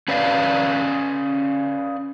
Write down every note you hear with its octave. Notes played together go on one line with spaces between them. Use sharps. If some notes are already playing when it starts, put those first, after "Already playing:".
C#4 B4 C#5 D5 F5